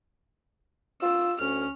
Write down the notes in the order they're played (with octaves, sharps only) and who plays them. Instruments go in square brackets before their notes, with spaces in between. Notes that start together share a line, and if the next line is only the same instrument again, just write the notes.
[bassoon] F4 [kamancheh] E6
[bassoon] D2 [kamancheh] C#4 F6